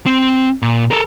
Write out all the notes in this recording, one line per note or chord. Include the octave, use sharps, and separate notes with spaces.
C4
A#2
A4 A#4